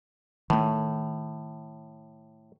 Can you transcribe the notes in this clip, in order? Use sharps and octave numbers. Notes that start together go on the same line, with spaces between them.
A2 D#3 A3